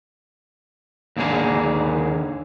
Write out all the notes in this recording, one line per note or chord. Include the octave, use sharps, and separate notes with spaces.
D#2 D3 A#3 G#4 A#4